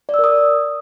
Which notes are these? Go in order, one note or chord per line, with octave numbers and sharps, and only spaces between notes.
D5
E6
A#4
D#6